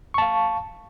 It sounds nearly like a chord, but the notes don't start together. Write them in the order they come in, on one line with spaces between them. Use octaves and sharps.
C#6 A5 F5